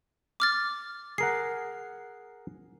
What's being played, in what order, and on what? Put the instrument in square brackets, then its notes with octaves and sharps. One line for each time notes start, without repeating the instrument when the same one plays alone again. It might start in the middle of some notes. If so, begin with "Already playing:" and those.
[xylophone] D6 F6 A6
[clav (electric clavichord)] G#4 A#4 F#5 [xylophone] C7